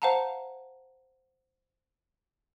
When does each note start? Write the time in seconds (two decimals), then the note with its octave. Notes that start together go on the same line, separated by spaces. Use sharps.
0.02 C5 F5 F#5 A5 A#5